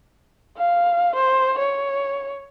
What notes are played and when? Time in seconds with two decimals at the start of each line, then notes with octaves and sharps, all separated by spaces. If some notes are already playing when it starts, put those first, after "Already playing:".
0.57 F5
1.16 C5
1.59 C#5